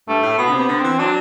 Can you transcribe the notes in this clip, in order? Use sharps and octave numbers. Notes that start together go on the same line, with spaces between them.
G2 A3
A2
B2 B3
D3
C3
B3
D3
E3 C4
F#3 D4